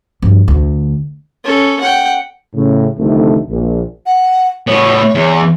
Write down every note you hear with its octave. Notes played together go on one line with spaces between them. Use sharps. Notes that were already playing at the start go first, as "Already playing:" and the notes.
G2 F3
D2
C#4 A4
F#5 G5
A2 C#3
C2 F2 D3 D#3 A3
A#1
F#5
A2 B3 C#5
E2